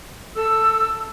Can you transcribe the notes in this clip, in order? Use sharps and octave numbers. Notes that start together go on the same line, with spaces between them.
A4 E6